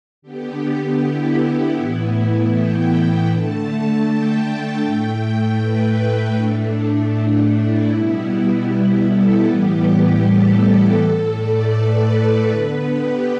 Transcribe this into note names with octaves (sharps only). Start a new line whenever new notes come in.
D3 B3 G4
E4
A2 E3 B3 E4
G5
D3 A3 A5
A5
G5
A2 A3 G5
B4
A2 A3 D4
E4
B2 G3 B3
A4
A2 E3 G3 B3 G4
A4
A2 A3
D5
B4
D3 B3
G4